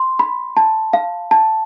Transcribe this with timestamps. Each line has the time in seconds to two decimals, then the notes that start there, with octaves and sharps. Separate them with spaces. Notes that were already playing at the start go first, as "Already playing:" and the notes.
Already playing: C6
0.19 B5
0.57 A5
0.93 F5
1.31 A5